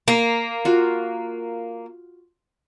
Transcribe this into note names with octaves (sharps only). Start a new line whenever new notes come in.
A#3 A#5
F4 F#4